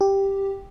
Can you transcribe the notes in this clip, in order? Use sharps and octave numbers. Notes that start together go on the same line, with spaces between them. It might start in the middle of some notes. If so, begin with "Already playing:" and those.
G4